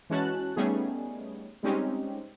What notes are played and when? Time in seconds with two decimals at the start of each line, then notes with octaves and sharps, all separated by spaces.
0.10 E3 G#3 C#4 F#4 A5 F#6
0.56 G3 A3 B3 C#4 D#4 G#4
1.63 G3 G#3 C4 C#4 D#4 G4